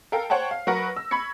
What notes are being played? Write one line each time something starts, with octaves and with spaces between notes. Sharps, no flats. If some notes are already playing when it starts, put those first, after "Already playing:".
A4 A#4 F5 G5
C5 C#5 F#5 G5 A5
F5
F#3 A#4 B4 F#5 C#6 A#6
E6
B5 C#6 G#6 C#7